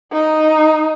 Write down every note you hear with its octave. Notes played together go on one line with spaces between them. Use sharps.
D#4